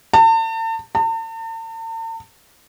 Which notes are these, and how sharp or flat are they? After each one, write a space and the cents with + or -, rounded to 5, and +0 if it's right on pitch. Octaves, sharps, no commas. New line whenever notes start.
A5 +40
A5 +45